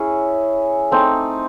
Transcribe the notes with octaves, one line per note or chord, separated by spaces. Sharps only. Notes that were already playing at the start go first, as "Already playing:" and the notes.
Already playing: C#4 E4 G#4 C#5
A3 C4 D#4